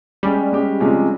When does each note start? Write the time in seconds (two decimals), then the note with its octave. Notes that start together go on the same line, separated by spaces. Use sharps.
0.23 G3 G#3 C#4 G4
0.52 G#3 C#4 G4
0.80 C3 F3 G#3 C#4